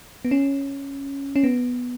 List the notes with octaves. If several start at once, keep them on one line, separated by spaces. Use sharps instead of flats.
B3
C#4
C#4
B3